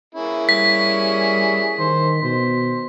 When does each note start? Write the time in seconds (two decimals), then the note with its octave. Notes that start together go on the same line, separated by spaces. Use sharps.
0.15 A#3 C#4 E4 G#4
0.49 G3 B6
1.79 D#3 C5
2.23 B2 C5